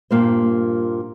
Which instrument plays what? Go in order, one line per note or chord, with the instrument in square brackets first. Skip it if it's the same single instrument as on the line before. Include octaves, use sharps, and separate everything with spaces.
[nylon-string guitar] G2 A#2 A#3 F4 C5